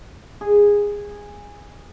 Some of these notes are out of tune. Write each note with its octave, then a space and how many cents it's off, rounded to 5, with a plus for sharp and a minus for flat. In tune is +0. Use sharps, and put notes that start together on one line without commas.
G#4 -15